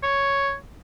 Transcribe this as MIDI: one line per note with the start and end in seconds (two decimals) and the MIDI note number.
0.03 0.54 73